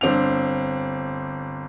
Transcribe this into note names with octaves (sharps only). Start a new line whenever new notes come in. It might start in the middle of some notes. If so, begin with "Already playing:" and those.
G1 C4 D4 F7